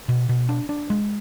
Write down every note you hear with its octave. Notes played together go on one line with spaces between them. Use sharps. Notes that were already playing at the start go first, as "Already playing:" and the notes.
B2
B2
D4
D4
G#3